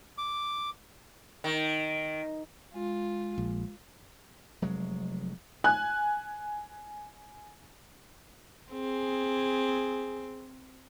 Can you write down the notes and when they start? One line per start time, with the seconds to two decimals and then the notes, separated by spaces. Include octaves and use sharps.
0.18 D6
1.44 D#3
2.74 G#3 F4
3.38 A#1
4.62 F1 F#3 G#3
5.64 G#5 F#6
8.72 C4 G#4